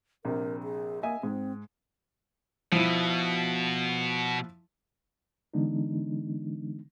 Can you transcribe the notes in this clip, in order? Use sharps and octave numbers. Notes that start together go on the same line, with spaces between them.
A#1 C3 A#4
G#4
A#3 D#5 E5 G#5
G#2 C4
B2 F3 E4
D3 E3 G#3 B3 D4 D#4